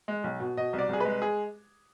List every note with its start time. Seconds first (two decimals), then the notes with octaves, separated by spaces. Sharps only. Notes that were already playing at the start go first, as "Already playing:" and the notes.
0.08 G#3
0.24 B1
0.40 B2
0.57 B2 D#5
0.73 C2
0.79 D5
0.89 C2 G#4
1.00 G#3 B4
1.22 G#4